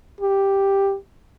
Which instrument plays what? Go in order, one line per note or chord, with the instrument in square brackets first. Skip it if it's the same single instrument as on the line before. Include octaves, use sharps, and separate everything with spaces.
[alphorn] G4